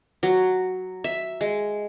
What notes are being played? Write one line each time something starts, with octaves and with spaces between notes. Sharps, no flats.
F#3
E5
G#3